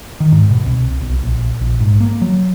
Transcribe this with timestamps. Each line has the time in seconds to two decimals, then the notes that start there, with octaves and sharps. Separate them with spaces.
0.20 D#3
0.32 G#2
0.51 B2
0.65 C2
1.01 B1
1.23 A#1
1.61 A#1
1.80 G#2
2.01 A#3
2.22 F#3